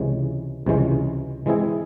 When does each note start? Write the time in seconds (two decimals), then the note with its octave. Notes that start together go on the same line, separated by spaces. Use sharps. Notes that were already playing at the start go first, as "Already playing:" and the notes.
Already playing: C#2 C3 E3 G#3 C#4
0.66 C#2 C3 E3 G#3 C#4
1.46 E3 G#3 C4 E4 G#4